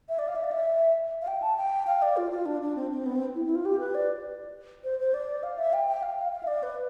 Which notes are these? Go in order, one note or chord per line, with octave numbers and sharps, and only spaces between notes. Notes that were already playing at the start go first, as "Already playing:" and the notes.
E5
D5
F5
E5
D5
E5
F5
G5
A5
G5
F5
D5
F4
F4
D4
D4
C4
C4
B3
C4
E4
E4
F4
G4
B4
D5
C5
C5
D5
F5
E5
G5
G5
F5
F5
F5
E5
D5
B4